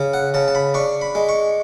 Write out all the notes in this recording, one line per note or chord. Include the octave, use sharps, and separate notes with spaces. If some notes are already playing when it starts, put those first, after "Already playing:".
Already playing: C#3
F#5
C#3 A5
A5
B5
D4 C#6
B5
G#3
C#6